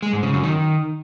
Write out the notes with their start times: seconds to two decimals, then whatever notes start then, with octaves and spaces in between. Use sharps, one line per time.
0.02 G#3
0.13 G#2
0.23 C#3
0.33 F#2
0.44 D#3